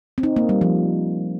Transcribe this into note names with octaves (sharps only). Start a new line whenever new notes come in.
C4
D#4
A#3
G3
F3